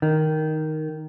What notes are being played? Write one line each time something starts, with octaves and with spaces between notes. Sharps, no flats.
D#3